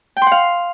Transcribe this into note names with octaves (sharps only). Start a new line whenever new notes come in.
G5
C6
F#5
F5